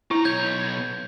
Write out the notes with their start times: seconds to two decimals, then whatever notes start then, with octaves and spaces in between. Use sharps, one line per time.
0.11 D#4 E4 A#5
0.25 B1 C#5 G6 G#6